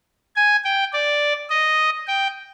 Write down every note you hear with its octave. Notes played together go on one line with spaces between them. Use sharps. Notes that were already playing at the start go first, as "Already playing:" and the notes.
G#5
G5
D5
D#5
G5